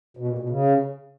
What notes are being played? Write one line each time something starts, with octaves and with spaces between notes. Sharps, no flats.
B2
A#2
B2
C#3